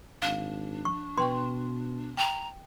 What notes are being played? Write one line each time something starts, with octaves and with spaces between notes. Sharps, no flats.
G#1 D4 F5
C#6
B2 B4 G5 C6 C#6
G5 A#5